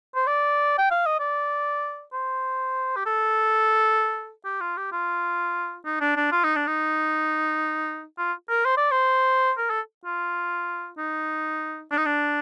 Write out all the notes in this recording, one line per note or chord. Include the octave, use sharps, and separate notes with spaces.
C5
D5
G5
F5
D#5
D5
C5
G4
A4
G4
F4
G4
F4
D#4
D4
D4
F4
D#4
D4
D#4
F4
A#4
C5
D5
C5
A#4
A4
F4
D#4
D4
D#4
D4